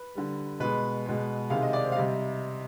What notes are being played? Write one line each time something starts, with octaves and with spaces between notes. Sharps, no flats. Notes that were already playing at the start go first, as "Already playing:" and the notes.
Already playing: B4
D3 G3
B2 G#3 B4
B2 G#3
C3 D#3 G#3 F5
D#5
D5
C5
F5
C3 G3 D#5